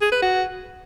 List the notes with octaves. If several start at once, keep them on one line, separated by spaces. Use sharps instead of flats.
G#4
B4
F#4